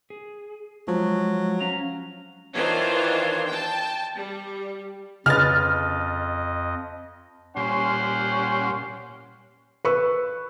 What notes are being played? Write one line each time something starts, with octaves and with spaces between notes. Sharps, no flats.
G#4
F3 F#3 G#3
C#4 F5 A#5
D#3 E3 D4 F4 C5 C#5
G5 A5
G3
F2 C#3 B4 D#5 F6 A6
A#2 G3 C#4 C5 F#5 C6
B4 C#6 E6